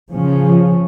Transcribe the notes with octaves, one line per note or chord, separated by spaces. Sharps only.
C#3 F3 C#4